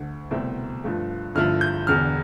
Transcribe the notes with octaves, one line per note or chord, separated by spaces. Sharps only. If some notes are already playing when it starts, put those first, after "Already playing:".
Already playing: D2 D3 A3
C2 B2 A3 C4 E4
G2 F3 A3
G1 G2 F3 A3 E4 F6
G6
E1 E2 D3 F6